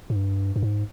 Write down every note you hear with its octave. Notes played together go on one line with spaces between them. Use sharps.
G#2
G2
G2
G#2